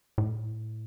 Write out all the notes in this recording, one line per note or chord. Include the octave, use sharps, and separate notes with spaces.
A2